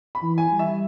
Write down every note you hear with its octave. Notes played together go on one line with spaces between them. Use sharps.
B5
E3
G#5
G3
E5